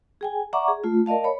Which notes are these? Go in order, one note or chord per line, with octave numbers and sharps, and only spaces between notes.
G#4 G5 G#5
D5 E5 F#5 A#5 C#6 D6
G#4
A3 F4
A#4 D5 D#5 F5 A5
C#5 B5